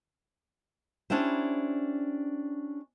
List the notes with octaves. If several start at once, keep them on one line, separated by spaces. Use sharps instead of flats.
C#4 D4 E4 G4 C5